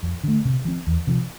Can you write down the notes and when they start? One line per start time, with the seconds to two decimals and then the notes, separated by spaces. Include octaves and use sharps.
0.03 F2
0.23 D3 A3
0.45 C3
0.65 F3 C4
0.87 E2
1.07 C3 F3